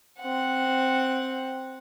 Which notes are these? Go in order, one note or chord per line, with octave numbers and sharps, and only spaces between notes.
C4 F#5